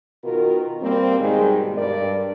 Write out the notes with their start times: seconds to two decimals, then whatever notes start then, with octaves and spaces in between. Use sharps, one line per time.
0.24 B2 D#3 F4 F#4 A#4
0.82 G3 A#3 C4
1.20 G#2 B2 D#3 G3 G#3
1.77 G2 A#4 D5